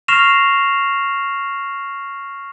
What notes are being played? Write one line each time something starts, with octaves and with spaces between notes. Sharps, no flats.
C#6 F6 A#6 C7 E7 F7